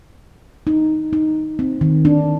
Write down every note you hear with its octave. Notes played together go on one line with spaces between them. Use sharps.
D#4
D#4
C4
D#3
D4